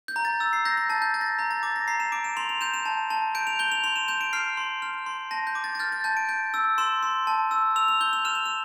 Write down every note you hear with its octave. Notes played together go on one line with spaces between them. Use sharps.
G6
A#5
A6
E6
C7
G6 A#6
A#6
A5 A6
G6
G6 A6
A#6
A6
A#5 G6
A6
D6 A6
A#6
A#5 C7
E7
D6 D7
E7
C6 F7
F7
G6 E7
E7
A5
A5
G6 D7
F7
G6 G7
F7
C6 F7
E7
G6 E7
D7
F6 C7
C6
F6
C6
A5 A#6
G6
D6
A6
A6
F6 G6
A6
A5 G6
D7
G6
E6
C6 E7
C6
A5
E6
E6 F7
F7
G6 G7
F7
F6 E7
F7
E7